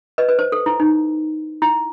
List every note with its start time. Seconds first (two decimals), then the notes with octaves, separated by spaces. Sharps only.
0.18 B4 D#5
0.29 B4
0.39 C5
0.52 A4
0.66 E4
0.80 D#4
1.62 E4